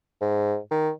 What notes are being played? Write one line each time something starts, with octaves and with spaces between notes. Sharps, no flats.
G#2
D#3